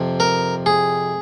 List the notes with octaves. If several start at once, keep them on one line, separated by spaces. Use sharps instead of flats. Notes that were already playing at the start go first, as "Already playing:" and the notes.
Already playing: F2 C3 F3
A#4
G#4